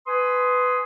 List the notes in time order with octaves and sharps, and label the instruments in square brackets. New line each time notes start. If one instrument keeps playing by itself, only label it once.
[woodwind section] B4 G#5 C6 D#6